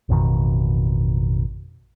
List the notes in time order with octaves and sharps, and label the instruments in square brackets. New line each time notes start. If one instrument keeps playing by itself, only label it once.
[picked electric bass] A1 F2 B2 D#3